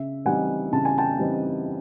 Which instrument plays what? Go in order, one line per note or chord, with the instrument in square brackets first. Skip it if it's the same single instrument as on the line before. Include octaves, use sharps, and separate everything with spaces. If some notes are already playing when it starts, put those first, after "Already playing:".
Already playing: [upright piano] C#3 E5
E3 G3 C4 D#4 F#5 G#5
C#3 A5
G#5
G5 A5
E3 G3 C4 D#4